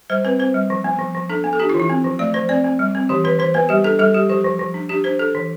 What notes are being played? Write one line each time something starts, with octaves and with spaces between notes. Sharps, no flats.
G3 C5
C4 B4
C4 C5
G3
F3
B3
F3
F3
D4 A4
B3
A4
D4 G4
F4
E3 E4
C4
F3
A3 D5
F3 C5
C4 D5
C4
G3
C4
E3 G4
E3 B4
E3 C5
B3 B4
G3 G4
D4 A4
G3 A4
G3 G4
F3 G4
F3
F3
D4
D4 G4
D4 C5
D4 A4
E3